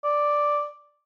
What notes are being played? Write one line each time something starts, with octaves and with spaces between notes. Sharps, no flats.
D5